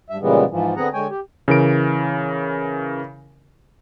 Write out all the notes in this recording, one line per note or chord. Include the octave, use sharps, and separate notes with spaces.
G2 E5
A#2 C#3 E3 G3 G#3 B3
G#2 E3 F3
D3 B3 C4 G#4 F#5 A#5
D3 G#3 C#5 G5 G#5
G4
C#3 E3 A#4 D7